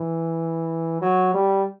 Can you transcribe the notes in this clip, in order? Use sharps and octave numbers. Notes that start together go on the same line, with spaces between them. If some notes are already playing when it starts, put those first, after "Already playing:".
Already playing: E3
F#3
G3